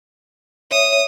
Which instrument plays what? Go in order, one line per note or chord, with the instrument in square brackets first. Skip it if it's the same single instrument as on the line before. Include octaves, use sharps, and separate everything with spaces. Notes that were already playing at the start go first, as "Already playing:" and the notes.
[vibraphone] C#5 E5 [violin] D#6